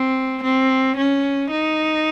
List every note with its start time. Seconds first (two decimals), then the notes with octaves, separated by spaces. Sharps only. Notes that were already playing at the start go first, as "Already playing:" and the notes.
Already playing: C4
0.43 C4
0.97 C#4
1.50 D#4